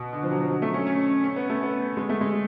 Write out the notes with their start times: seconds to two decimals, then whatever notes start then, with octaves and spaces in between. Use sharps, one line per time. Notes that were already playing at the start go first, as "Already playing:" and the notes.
Already playing: B2
0.13 D3
0.23 F3
0.31 F#3
0.41 F3
0.50 F#3
0.62 A3
0.74 C#4
0.87 C#4
1.24 C#4
1.36 B3
1.50 A3
1.63 B3
1.97 G#3
2.09 A3
2.21 G#3